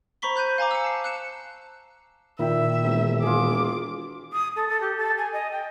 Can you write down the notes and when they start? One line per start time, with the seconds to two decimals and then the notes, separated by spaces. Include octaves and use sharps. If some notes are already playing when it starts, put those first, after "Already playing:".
0.22 C5 A#5 B5 C#6 B6 G7
0.36 C5 F#6 G6 D#7
0.58 F5 G#5 A#5 D6
0.71 E6 C#7
0.84 A5 C7
1.04 F#6 C#7 E7
2.39 A#2 D#3 E4 E5 G5
2.84 E1
3.22 F4 G#4 D6
4.33 D#6
4.56 A4
4.69 A4
4.81 G4
4.97 A4
5.18 G#5
5.33 D#5
5.51 G5